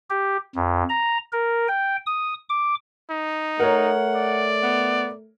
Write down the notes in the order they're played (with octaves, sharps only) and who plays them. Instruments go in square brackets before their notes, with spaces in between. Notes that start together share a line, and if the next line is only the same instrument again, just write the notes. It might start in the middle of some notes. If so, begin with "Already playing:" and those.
[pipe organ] G4
F2
A#5
A#4
G5
D#6
D6
[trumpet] D#4
[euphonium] A3 [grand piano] A#4 C#5 [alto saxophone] F#5
[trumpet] D5
[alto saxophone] B3